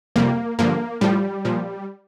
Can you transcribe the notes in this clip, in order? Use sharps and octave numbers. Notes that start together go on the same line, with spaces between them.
F2 C3 G3 A#3
G2 D3 F3 A#3
A2 F3 G3
A#2 F3